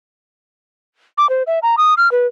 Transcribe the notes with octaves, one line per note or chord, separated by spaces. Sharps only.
D6
C5
E5
A#5
D#6
F6
B4